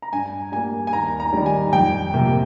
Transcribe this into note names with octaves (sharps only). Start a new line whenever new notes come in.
A#5
G2 G#5
G3 A#3 G#5
G#5
D#2 A#5
A#5
D#3 G3
G#5
F2 G5
C3 F3 A#3